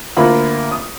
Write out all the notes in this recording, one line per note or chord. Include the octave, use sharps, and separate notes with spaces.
D2 A#3 E4 F4 B5
D#6